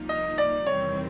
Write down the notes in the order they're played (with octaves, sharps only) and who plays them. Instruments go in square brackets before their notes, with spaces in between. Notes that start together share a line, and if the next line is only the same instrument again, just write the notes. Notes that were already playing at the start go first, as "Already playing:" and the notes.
Already playing: [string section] C2 A#2 F3 A#3 D#4
[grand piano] D#5
D5
[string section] E2 C3 D#3 G3 C4 [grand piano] C#5